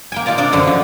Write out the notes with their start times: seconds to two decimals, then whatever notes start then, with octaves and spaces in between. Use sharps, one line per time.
0.12 A#3 G5 G#5
0.26 A#3 D#4 F4 D5 A#5
0.38 C3 D4 A#4 D5 D#5
0.52 F#2 D3 F#5
0.67 F3